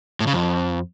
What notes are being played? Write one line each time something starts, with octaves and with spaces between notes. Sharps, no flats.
A2
C#3
F2